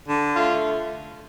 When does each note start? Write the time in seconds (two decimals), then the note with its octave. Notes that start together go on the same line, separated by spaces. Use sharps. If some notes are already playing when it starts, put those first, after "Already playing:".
0.08 D3
0.36 A3 F4